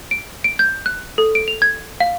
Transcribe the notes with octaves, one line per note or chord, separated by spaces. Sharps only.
D7
D7
G6
F#6
A4
D7
F7
G#6
F5